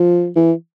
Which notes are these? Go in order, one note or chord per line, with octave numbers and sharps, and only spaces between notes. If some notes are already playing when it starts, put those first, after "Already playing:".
Already playing: F3
E3